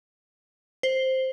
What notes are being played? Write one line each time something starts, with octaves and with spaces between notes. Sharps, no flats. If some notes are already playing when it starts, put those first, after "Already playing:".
C5